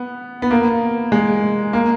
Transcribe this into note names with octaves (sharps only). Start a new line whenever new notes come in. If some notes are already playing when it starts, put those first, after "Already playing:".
Already playing: B3
B3
A#3
G#3
A#3